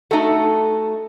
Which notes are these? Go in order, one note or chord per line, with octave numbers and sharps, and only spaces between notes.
A3 D#4 F#4 A4